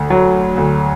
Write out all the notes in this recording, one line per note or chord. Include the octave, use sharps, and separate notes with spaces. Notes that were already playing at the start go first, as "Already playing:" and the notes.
Already playing: D2
F#3
D2